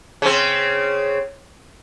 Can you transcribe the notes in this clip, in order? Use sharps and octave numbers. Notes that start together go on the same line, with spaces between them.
C#3 C4